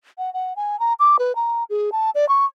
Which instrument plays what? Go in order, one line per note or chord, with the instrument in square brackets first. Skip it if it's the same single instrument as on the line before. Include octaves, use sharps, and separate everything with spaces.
[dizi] F#5
F#5
G#5
A#5
D6
B4
A#5
G#4
A5
D5
C#6